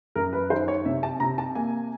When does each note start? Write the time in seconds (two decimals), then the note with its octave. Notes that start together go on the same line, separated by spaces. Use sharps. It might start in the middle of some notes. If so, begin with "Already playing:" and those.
0.15 F#2 A#4
0.33 B4
0.50 D#3 C5
0.68 C#5
0.85 C3 E5
1.03 A5
1.20 C3 A#5
1.38 A5
1.55 A#3 G#5